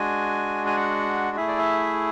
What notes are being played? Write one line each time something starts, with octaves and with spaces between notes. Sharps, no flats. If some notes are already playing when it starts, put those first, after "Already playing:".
Already playing: G#3 D4 F#4 G#5
G#5
F#5
A3 E4 G#4 E5
D5
E5